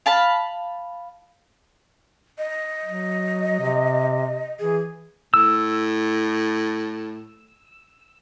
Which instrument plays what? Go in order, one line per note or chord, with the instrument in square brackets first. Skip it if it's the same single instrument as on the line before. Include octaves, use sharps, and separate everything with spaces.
[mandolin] F5 A5 B5
[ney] D#5
[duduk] F#3
C3
[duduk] E3 [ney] G#4
[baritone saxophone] A2 [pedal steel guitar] E6